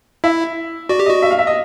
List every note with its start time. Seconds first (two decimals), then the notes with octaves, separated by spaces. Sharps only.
0.24 E4 E5
0.89 F#4 D5
1.00 G4
1.06 F#4 D#5
1.22 E5
1.31 F5
1.39 E5
1.47 D#5